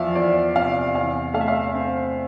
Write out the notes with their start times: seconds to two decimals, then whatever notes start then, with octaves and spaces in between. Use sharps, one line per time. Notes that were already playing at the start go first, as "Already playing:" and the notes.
Already playing: E2 F3 D5 E5 F5
0.15 E2 D5
0.56 C3 F5
0.94 E2 F5
1.34 A3 F5
1.41 E5
1.48 F5
1.74 C4